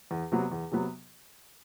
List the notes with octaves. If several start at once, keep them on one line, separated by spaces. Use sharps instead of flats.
E2
C3 F#3 B3
E2
C3 F#3 B3